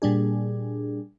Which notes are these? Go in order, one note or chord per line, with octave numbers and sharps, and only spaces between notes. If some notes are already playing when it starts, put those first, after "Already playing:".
A#2 G3 D4 G#4